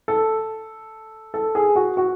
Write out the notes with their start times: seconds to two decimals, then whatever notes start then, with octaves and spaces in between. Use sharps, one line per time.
0.08 A4
1.34 A4
1.55 G#4
1.76 F#4
1.97 F#4